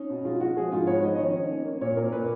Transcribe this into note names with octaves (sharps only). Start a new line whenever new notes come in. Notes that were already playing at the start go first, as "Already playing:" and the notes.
Already playing: C#4 D#4
B2
G#3 F4
G#3 F#4
F3 G#4
G#2 F4
B3 C#5
F3 D#5
D#5
D#3 C#5
C#4
A#3
A#3
A#2 C#5
A#2 A#4
A#2 B4